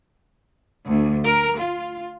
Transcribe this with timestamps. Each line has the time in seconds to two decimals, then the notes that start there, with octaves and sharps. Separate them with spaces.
0.84 D2
1.25 A#4
1.58 F4